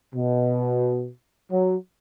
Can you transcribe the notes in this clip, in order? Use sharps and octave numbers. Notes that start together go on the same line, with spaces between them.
B2
F#3